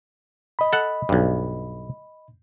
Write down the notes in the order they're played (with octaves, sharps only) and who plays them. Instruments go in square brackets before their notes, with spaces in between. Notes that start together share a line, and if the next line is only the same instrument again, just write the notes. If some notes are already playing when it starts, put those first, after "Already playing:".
[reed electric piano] D#5 B5
[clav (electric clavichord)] A4 F#5
B1 G2